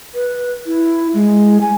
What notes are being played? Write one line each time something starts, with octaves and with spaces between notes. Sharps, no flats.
B4
E4
G#3
G#5